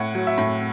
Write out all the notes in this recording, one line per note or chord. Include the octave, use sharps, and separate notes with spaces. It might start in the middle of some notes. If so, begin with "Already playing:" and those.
Already playing: A2 F#5
F#3
E5
A2